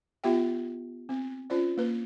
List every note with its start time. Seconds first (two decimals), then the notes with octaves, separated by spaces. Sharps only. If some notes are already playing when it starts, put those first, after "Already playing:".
0.24 B3 F4 G4 E5 G5
1.09 C4
1.50 C#4 F4 C5 D5
1.77 A#3 B4